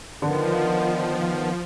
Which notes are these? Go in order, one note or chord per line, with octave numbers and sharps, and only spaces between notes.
D3 D#3 F3 B3